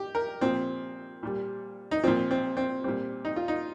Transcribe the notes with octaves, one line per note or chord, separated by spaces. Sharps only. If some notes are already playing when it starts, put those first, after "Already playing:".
Already playing: G4
A#4
A#2 F3 C4
A#2 G3
D#4
A#2 F3 C4
C4
C4
A#2 G3 C4
D#4
F4
D#4